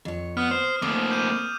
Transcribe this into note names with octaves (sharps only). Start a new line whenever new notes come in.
F2 C#5
B3 D#6 F6
C5
A3 A#3 C4 D6 D#6
G6 D#7